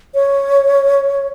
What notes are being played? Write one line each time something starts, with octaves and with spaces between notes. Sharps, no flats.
C#5